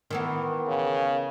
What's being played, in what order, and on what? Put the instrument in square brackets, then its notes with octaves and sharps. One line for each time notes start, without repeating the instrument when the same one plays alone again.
[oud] D#3 E3 B3
[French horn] C#3